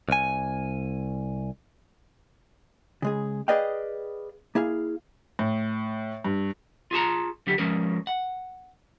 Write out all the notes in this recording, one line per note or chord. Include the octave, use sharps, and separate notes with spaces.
C2 G#5
C#3 G#3 G#4
G#4 B4 D5 D#5 F5 G5
A#3 E4 G#4 F5
A2
G2
F4 G#4 A5 A#5
D3 F#3 G4
F3 G#3 C#4 A#4
F#5